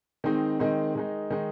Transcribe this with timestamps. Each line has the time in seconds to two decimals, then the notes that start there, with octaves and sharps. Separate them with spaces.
0.24 D#3 G#3 C4 D#4
0.59 D#3 G#3 C4 D#4
0.95 D#3 G#3 D#4
1.30 D#3 G#3 D#4